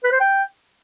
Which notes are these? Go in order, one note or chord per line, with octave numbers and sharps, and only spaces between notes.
B4
C5
G5